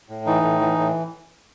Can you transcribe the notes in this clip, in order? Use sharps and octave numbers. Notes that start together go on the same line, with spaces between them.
A2
E3 D#4
A2
E3
A2